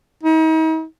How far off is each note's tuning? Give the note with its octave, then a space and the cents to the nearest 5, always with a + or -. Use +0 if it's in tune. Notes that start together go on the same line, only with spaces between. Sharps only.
D#4 +40